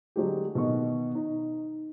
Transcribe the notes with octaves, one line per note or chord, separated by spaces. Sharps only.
D3 F#3 G#3 G4
B2 D#3 D#5 C#6
D#4